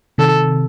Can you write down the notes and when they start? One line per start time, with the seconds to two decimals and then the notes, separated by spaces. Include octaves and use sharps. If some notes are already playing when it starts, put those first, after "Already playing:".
0.18 C3 D#3 A4